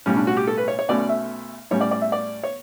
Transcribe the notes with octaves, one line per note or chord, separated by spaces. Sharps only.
B1 A2 G3 C#4
D4
F#4
G4
A4
B4
C#5
C#5
B1 B2 A3 C#4 D5
E5
A2 G3 C#4 C#5
D5
D5
E5
D5
C#5